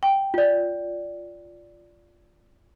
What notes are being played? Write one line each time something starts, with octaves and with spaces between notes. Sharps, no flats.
G5
F4 D5